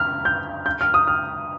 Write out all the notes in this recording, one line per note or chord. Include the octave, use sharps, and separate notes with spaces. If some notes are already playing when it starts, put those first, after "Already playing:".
Already playing: F6
G6
G6
F6
D#6
F6